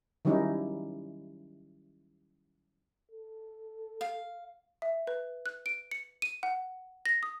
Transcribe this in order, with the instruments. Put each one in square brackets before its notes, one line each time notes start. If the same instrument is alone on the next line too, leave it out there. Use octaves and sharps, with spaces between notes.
[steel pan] D#3 F#3 G3 C#4 D#4 E4
[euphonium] A4
[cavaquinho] F5
[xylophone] E5
B4
F#6
D7
C#7
D#7
F#5
A#6
D#6